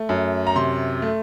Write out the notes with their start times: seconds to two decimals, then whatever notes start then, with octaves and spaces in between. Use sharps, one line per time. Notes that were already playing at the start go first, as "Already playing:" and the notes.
Already playing: A3
0.09 F#2
0.47 A#5
0.56 C3 C6
1.02 A3